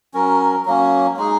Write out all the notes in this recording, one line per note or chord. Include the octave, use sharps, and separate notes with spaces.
F#3 C#4 A#4
F#3 A#3 C#4
G#3 D#4 G#4